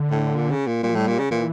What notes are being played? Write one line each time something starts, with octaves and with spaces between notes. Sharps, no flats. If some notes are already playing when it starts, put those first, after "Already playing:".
Already playing: D3
A2
A#2
C#3
A#2
A#2 G3
F3
A2 G3
A#2
C#3
A#2 E3